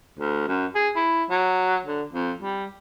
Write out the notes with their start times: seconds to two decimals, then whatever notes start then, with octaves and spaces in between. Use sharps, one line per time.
0.19 D2
0.47 F#2
0.75 G#4
0.96 E4
1.30 F#3
1.86 D3
2.13 F2
2.42 G3